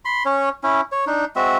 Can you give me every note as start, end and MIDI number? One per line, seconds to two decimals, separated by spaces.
0.05 0.23 83
0.05 0.23 84
0.25 0.49 61
0.25 0.49 73
0.63 0.81 61
0.63 0.81 64
0.92 1.05 73
1.07 1.25 62
1.07 1.25 63
1.36 1.58 56
1.36 1.58 60
1.36 1.58 66
1.36 1.58 76